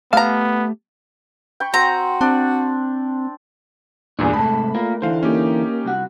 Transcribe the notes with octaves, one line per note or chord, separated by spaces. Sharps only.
A3 B3 G4 F5 A5 A#5
G5 B5 C#6
C4 F#4 A#5
C4 D4
E2 G2 A#2 D4 G#4
G#2 C3 A3 A5 B5
A#3 F4 A#4
D3 E3 C5 F5
A#3 C#4 D#4 G4
C2 F#4